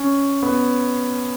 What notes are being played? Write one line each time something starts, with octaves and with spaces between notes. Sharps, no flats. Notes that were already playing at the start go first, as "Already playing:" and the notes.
Already playing: C#4
B3